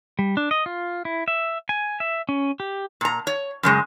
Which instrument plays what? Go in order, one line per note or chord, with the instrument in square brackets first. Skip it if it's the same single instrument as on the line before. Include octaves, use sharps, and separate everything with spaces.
[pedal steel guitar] G3
D4
D#5
F4
E4
E5
G#5
E5
C#4
G4
[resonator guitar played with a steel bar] A#2 A#5
C#5
F#2 C#3 G#3